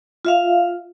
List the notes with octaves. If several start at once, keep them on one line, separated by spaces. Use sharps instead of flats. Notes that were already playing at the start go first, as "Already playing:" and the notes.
F4 E5 F5